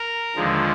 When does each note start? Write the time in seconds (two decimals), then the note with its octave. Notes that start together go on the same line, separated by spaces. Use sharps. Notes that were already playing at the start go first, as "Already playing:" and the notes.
Already playing: A#4
0.36 D#2 D3 F3 G#3